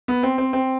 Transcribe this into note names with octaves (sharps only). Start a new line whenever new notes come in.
B3
C4
C4
C4